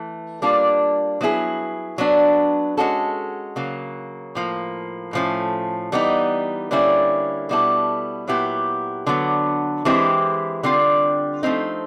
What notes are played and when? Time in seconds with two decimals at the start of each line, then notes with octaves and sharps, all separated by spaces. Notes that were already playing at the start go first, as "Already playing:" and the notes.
Already playing: E3 A3
0.42 G3 A#3 D4 F4
1.21 F#3 B3 E4 G#4
1.98 F#3 B3 D4
2.77 G#3 C#4 F#4 A4
3.56 C#3 F#3 A#3
4.35 A2 F3 A#3
5.13 A2 F3 A3 C#4
5.92 E3 G3 B3 D#4
6.71 D3 G3 A#3 C#4 E4
7.49 B2 G3 B3 E4 A4
8.28 A#2 F#3 B3 E4 G4
9.07 D3 F#3 B3
9.85 E3 G#3 C4 E4 G4
10.63 D3 G3 C4 F4
11.43 F3 A3 C4 D#4